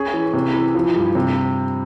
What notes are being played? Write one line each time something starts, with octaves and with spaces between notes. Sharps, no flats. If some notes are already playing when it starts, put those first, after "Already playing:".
Already playing: C#4 G#4
E3
C3
E3
F3
G2
C3